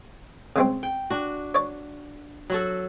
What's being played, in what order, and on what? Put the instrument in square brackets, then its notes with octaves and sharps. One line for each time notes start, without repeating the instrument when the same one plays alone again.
[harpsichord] C#3 G#3 C4
[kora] G5
D4 F#4
[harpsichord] C#5 D5
[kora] F#3 F#4 A4